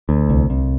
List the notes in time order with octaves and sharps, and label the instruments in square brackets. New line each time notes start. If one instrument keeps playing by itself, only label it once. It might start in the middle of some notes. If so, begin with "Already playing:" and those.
[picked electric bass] D2
C2
C2